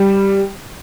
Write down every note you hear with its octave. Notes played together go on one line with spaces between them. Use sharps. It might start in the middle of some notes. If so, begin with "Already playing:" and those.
Already playing: G3